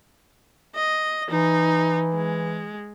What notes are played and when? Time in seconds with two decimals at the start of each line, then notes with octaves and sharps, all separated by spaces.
0.75 D#5
1.30 E3 D#4
2.15 G#3